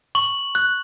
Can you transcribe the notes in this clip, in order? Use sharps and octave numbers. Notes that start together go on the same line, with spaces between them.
C#6 F#7
F#6